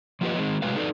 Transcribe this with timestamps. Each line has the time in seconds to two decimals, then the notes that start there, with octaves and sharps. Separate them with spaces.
0.21 F3 A#3 F4 G4 B4 D#5
0.37 D#3 G#3 C4
0.62 A2 C3 F#3 G#3 B4 F5
0.76 D#4 A4 B4 D5